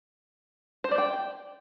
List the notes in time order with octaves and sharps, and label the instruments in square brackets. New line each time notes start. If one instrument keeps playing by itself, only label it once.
[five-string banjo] C5
D5
G5